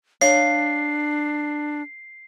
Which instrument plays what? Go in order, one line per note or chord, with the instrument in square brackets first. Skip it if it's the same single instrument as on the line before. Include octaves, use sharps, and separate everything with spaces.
[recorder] D4 [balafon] C#5 [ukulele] F5 [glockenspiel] C7